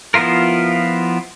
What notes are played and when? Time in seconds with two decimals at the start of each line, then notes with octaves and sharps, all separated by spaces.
0.14 F3 B3 E4 F4 A#4